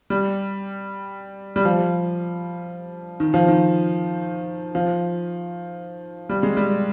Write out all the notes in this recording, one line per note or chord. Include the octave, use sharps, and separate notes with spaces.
G3
G3
F3
D#3
F3
D#3
F3
G3
G#3
G3